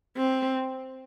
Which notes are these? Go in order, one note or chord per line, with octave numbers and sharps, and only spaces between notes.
C4